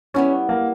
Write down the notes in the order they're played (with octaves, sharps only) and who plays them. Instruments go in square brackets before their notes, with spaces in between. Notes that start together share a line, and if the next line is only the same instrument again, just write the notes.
[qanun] G3 B3 E4 [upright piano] C#4
[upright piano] A#3